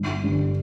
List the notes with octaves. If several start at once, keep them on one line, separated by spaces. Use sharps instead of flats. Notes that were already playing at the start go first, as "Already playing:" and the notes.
Already playing: G1
G2 D3